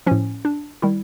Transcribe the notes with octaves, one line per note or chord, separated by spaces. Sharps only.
A2 F3 C#4
D4
D#3 G3 E4